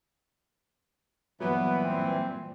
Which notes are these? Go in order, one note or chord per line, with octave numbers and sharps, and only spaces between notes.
G2 A#2 E3 F#3 B3
C4